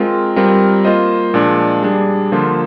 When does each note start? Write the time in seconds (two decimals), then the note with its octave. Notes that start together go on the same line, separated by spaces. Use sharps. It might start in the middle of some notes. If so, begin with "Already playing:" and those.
Already playing: G#3 C4 F4 A#4
0.36 G3 C4 F4 A#4
0.85 A#3 F4 C5 D#5
1.34 A#2 F3 G#3 D4
1.83 G3 D4 G#4
2.32 D3 F3 A#3 F4 C5